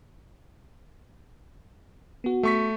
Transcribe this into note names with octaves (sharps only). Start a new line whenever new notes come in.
B3 F#4
A3 C#6 B6